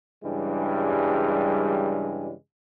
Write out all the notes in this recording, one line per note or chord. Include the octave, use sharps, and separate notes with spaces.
G2 C#3 E3 G3 G#3